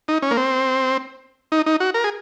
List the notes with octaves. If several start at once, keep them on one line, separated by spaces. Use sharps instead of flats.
D#4
C#4
A#3
C4
D#4
D#4
F#4
A#4
G#4